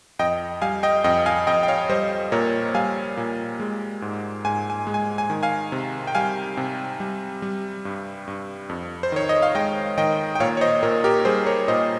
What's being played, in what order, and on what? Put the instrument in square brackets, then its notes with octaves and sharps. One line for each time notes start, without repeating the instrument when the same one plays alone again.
[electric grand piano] F2 D#5 G5
G3 F5 G#5
D#5 G5
F2 D#5 G5
F5 G#5
F2 D#5 G5
G5
C#5 F5
G3 C5 D#5
A#2 A#4 C#5
G3 F5 G#5
A#2
G#3
G#2
G#2 G#5
G#5
G#3
G#5
G#5
D#3
F5 G#5
C3
G5
G3 F5 G#5
C3
G3
G3
G2
G2
F2
C5
D#3 C#5
D#5
F5
G#3 D#5 G5
D#3 D#5 G5
G5
A#2 C#5 F5
C#5
C5 D#5
A#2 A#4 C#5
G4 A#4
G3 G#4 C5
A#4 C#5
A#2 C5 D#5